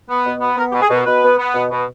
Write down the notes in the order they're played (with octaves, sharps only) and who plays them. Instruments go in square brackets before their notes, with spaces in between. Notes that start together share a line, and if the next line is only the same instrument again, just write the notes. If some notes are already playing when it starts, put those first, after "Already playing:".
[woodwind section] B3
B2
B3
B3 A#4
G4
B2
G#4
B2 A#4
B2 B4
B3
B3
B2
B2